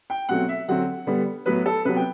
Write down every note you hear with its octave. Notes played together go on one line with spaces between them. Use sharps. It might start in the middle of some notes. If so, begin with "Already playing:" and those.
G5
B2 F#3 A3 C4 F#5
E5
D3 F#3 C4 F#5
D3 G3 B3
A2 F#3 B3 B4
A4
C3 F#3 B3 B4
G5